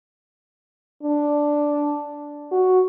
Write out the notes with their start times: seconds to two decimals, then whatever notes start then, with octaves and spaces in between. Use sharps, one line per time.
1.03 D4
2.52 F#4